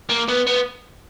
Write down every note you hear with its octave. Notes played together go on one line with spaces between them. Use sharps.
A#3
B3
B3